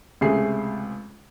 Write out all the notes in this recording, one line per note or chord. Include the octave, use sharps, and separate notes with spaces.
C#2 C3 A3 G#4 C7